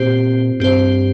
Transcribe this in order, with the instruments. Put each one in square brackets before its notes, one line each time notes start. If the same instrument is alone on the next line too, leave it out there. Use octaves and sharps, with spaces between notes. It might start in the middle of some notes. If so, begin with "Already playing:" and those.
Already playing: [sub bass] A#2 [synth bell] C4 G4 C5
[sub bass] G2 [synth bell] C4 G4 C5